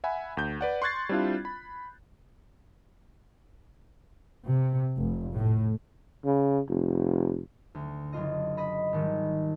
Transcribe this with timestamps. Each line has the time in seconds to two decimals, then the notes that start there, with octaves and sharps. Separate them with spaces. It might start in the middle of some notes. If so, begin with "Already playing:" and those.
0.04 E5 F#5 G#5 B5
0.37 D2 G6
0.61 B4 D5 F#5
0.82 C6 C#6 F#6 G#6 A6 C7
1.09 G3 C4 D4 E4 F4
1.45 B5
4.47 C3
4.99 F1
5.36 A2
6.25 C#3
6.69 F1
7.75 D2
8.13 F#1 D4 F4 D#5
8.57 D#5 B5
8.93 G#1 D#3 G3